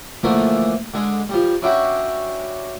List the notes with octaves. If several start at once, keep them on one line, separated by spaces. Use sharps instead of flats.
D3 E3 F3 A3 A#3
D3 G#3
F3 G3
C#4 D4 E4 F#4 G4